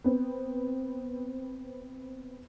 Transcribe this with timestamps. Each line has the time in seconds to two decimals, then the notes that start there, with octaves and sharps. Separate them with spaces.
0.04 B3 C4